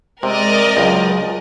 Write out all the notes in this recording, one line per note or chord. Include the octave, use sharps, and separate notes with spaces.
C3 G#3 A#4 D5 D#5
C#2 F#3